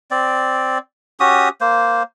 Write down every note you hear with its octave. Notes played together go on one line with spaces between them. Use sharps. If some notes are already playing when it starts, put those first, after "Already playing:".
C4 D5
C#4 F#4 G4 D#6
A#3 C5